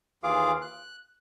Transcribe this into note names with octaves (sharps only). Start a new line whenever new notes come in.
D#2 E3 F4 G#4 F5 D6
F#6